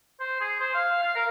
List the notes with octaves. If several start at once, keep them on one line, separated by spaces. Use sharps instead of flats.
C5
G#4
C5
F5
F5
A#4